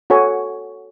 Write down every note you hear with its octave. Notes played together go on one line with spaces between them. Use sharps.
F#4 A4 C#5 G#5